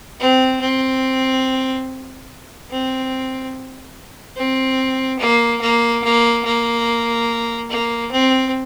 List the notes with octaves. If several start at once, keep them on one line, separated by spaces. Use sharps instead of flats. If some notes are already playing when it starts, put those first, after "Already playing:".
C4
C4
C4
C4
A#3
A#3
A#3
A#3
A#3
C4